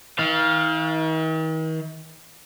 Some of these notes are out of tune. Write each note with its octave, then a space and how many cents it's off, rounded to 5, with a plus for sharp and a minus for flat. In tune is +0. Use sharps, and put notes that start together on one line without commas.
D#3 +45 F5 +0